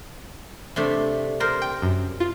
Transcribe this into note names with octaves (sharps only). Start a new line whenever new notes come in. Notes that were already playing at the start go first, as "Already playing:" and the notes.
C3 A3 D4
A#4 C5 D5
G5
F#2
F4